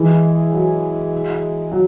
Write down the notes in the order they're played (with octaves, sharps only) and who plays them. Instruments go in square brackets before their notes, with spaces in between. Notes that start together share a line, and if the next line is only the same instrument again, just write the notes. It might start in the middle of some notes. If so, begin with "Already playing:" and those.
Already playing: [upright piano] E3 [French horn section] G#3 E4 G#4
[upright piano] F#3
F#3